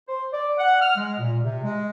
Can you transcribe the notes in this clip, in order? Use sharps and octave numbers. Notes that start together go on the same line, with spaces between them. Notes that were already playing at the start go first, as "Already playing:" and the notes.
C5
D5
F#5
F6
G#3
A#2
C3
G#3